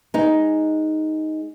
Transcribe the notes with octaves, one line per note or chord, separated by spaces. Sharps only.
G#3 D#4